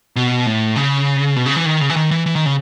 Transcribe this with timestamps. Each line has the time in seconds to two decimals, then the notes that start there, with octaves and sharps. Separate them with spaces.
0.16 B2
0.46 A2
0.76 C#3
1.36 B2
1.46 C#3
1.56 E3
1.66 D#3
1.81 C#3
1.90 E3
1.96 D#3
2.11 E3
2.26 E3
2.36 D#3
2.46 C#3